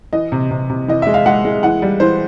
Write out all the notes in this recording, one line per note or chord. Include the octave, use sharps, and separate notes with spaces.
E3 D#5
C3
C3
C3
E3 D#5
G#3 E5
F5
G#3 F#5
G#3
E3 F#5
G3
E3 C5